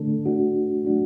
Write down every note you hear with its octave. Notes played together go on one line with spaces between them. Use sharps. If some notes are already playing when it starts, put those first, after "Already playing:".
Already playing: D3 A3 D4 A4
A3 D4 F#4
F#3 A3 D4 F#4